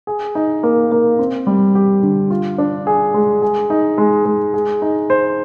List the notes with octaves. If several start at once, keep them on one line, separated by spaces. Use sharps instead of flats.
G#4
D#4
A#3
A#3
C4
G3
G4
D3
F4
D4
G#4
G#3
G#4
D#4
G#3
G#3
G#4
D#4
C5